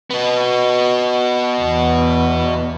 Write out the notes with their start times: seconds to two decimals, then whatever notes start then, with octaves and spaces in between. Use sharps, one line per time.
0.10 B2 B3
1.61 E2